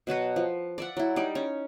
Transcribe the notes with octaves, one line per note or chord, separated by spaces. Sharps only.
B2 F#3 F#4 B4
F3
D5 E5 F#5
F#3 E4
G3 D#4 D5
C#4